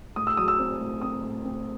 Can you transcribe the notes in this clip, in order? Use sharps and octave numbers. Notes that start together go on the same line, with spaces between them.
A2 D#6
E6
F#3 D#6
E6
C4
A2
C4 D#6
A2
C4